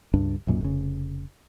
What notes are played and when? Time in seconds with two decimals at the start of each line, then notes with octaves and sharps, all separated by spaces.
0.13 C#2 G2 D4
0.47 B1 F#2 A#2
0.61 F1 C#3